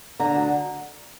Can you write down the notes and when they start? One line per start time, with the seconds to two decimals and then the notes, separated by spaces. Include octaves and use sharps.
0.19 D3 A#5
0.35 D2